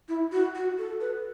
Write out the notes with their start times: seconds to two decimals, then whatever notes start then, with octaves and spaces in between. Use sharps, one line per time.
0.08 E4
0.32 F#4
0.55 F#4
0.78 A4
1.01 B4